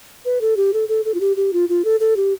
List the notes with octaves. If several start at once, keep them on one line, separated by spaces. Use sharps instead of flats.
B4
A4
G4
A4
A4
A4
F4
G4
G4
F4
F4
A4
A4
G4